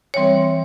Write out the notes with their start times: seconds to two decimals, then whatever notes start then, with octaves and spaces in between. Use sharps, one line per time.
0.14 E3 G3 C4 C#5